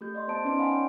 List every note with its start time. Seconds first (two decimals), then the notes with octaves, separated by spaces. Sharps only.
0.01 A3 G4 G6
0.14 D5 D#5 C6
0.28 B3 C5 D#5 A5 D7
0.45 C#4 D#4 B4 D5 C6 D7
0.58 D#5 F5 F#5 G#5 B5
0.72 C#5 G5